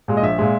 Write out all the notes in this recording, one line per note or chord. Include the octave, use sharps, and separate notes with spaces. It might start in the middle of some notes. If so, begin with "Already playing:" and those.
A#2 G#3
D#5
A#1 E5
A#2 G#3